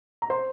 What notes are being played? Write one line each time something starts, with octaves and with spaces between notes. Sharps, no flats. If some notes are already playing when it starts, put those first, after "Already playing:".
A#5
C5 C6